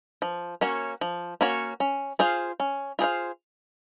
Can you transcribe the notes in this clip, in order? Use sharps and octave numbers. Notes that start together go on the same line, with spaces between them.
F3
A#3 C#4 F#4 C#5
F3
A#3 C#4 F#4 C#5
C#4
F4 G#4 C5 F5
C#4
F4 G#4 C5 F5